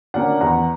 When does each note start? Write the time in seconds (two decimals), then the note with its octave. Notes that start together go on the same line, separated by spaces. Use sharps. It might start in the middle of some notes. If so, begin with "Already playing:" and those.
0.14 D3 A#3 C#4 D5 F#5
0.41 E2 F#5 A#5